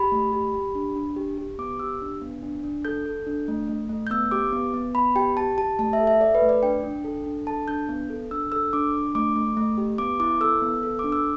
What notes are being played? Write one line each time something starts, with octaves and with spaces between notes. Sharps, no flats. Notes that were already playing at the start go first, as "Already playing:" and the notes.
Already playing: G4 B5
A3
G4
G4
D4
D4
G4
G4
B3 D6
G4 E6
D4
B3
D4
D4
A4 G6
A4
D4
A3
A3
A3
G6
B3 E6
G4 D6
B3
B3
B3 B5
G4 G5
G4 A5
G4 A5
A3 A5
E5
A4
E5
A4 D5
B4
A3
D5
D4 G5
D4
A4
D4
A4 A5
D4 G6
B3
A4
D4 E6
A4 E6
D4 D6
D4
A3 D6
A3
A3
G4
B3 D6
E4 D6
A4 E6
B3
A4
D4 D6
E6